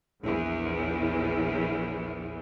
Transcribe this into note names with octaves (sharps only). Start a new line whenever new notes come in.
A#1 E2